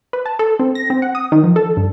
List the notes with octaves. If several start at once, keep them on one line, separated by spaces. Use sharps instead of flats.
B4
A5
A4
C4
A#6
C4
F#5
D#6
D#3
F3
A4
G2